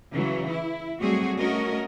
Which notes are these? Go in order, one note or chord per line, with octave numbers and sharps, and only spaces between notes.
C#3 E3 F#3
E4
F#3 G3 A3 C4 F#4 G#4
A3 C#4 F#4 A#4 D#5